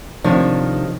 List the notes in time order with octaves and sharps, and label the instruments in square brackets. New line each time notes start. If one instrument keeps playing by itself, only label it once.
[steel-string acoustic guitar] C3 D#3 [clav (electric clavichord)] F3 D4 C#5